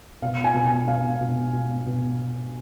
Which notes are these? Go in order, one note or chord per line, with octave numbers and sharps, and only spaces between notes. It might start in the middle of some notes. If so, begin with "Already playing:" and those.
B2 F5
G#5
B2
G#5
B2 F5
B2
B2
B2